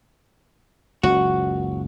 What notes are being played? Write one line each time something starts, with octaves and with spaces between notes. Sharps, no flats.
F#1 C#2 F#4